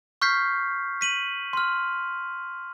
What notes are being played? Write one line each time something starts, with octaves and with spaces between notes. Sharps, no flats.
C#6 F6 G6 B6 C7
B6 D#7 F#7
C6 F6